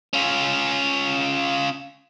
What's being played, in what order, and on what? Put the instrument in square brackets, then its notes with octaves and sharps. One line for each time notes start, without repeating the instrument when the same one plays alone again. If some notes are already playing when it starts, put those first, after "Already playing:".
[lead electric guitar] C#4 F4